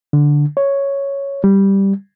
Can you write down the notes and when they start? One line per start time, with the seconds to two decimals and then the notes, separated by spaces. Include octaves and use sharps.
0.13 D3
0.57 C#5
1.44 G3